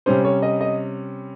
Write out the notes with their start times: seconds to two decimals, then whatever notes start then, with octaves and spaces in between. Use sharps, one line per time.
0.06 C3 G3 C#4 C5
0.25 C#5
0.42 D#5
0.61 D#5